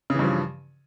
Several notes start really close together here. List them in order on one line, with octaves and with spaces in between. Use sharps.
C#3 E3 G2 F3